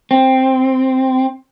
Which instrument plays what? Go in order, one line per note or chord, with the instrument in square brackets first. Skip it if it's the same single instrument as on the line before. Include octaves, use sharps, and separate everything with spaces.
[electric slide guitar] C4